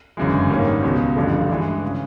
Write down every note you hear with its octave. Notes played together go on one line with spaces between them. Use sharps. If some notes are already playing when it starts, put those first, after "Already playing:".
G1 F#2 C#3 E3 G#3
G#2 D#3 G3 A#3 C#4
C#2 B2 G#3
A1 G2 D3 F3 A3
G2 E3 G#3
C#3